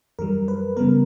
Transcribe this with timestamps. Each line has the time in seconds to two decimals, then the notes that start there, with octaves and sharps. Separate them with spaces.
0.19 F#2 E3 G3 A#4
0.48 B4
0.77 C#3 G3 B3 A#4